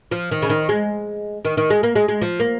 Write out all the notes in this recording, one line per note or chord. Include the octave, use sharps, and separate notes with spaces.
F3
D#3
C#3
D#3
G#3
D#3
D#3
G#3
A#3
G#3
G#3
F3
A#3